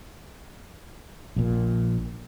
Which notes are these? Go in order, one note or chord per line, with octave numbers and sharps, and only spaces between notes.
A#1 A#2